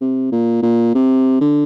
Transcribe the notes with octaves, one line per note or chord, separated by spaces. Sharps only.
C3
A#2
A#2
C3
D3